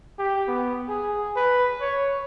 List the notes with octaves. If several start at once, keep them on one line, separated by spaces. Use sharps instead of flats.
G4
B3
G#4
B4
C#5